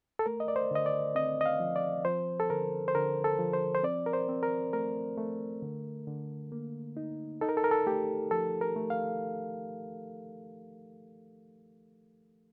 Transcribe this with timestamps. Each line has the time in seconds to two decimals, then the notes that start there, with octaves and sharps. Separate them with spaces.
0.19 A4
0.26 A3 A#4
0.40 D#5
0.48 D5
0.56 C5
0.71 D3 D#5
0.86 D5
1.15 C4 D#5
1.41 D#5
1.46 F5
1.60 F3
1.76 D5
2.05 F3 C5
2.40 A4
2.50 D3 A#4
2.88 C5
2.95 D3 A#4
3.24 A4
3.39 F3
3.53 C5
3.75 C5
3.83 C4 D5
4.06 A#4
4.13 C5
4.29 C4
4.43 A#4
4.73 A3 A#4
5.18 A3
5.62 D3
6.07 D3
6.52 A#3
6.97 D#4
7.41 D#4 A4
7.49 A#4
7.57 A4
7.64 A#4
7.71 A4
7.86 A3 G4
8.31 F3 A4
8.61 A#4
8.76 A3
8.90 F5